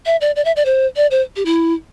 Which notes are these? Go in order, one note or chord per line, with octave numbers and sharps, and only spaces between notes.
E5
D5
D5
E5
D5
C5
D5
C5
G4
E4